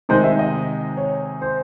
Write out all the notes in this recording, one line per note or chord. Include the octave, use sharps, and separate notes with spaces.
C3 D#3 G#3 D#4 C5
E5
D#5
C#5
C5